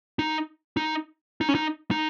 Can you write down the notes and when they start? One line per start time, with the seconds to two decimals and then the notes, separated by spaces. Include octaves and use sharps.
0.19 D#4
0.77 D#4
1.41 D#4
1.49 C#4
1.55 D#4
1.91 D#4